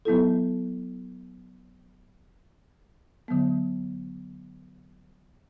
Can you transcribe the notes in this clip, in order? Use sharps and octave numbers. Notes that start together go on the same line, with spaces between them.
F#3 B3 E4 A4
D3 F#3 B3